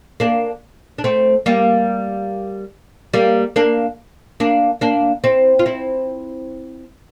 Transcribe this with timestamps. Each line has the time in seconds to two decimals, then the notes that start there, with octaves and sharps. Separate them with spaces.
0.20 A#3 D4
0.98 D4
1.04 A3 C4
1.46 G3 A#3
3.14 G3 A#3
3.56 A#3 D4
4.40 A#3 D4
4.81 A#3 D4
5.24 C4 E4
5.59 F4
5.66 C4 E4